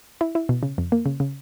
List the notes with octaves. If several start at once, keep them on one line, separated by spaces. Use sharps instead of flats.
E4
E4
B2
C#3
F2
A#3
C#3
C#3